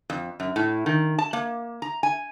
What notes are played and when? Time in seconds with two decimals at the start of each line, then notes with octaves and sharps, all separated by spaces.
0.10 F2
0.40 F#2
0.56 A2
0.86 D#3
1.18 A5
1.33 A#3
1.82 A#5
2.03 G#5